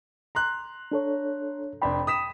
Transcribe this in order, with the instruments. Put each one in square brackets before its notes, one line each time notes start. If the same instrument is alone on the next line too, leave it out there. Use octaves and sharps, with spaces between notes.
[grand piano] A#5 C6 F#6
[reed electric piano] D4 A4 C#5
[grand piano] F1 D4 C6 [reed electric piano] G5 B5
[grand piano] D#6 B6 E7